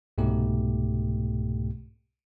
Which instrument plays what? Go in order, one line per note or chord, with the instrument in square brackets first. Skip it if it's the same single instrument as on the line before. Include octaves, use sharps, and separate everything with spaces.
[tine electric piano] C2 G#2 B2 A3 G4